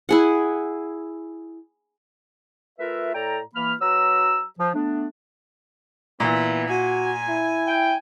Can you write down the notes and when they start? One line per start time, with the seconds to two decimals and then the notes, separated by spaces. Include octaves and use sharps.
0.09 E4 G#4 F#5
2.79 A3 F4 A#4 B4 E5
3.15 A2 A4 D5 G5 A#5
3.55 E3 A#3 B5 F6
3.81 F#3 F#4 B4 A#5 E6
4.59 F3
4.74 A3 B3 D4
6.20 A#2 E3 B3
6.70 F#4 G#5
7.28 E4
7.68 G5